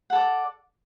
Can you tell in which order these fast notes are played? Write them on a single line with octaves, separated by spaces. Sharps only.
F#5 A4 D5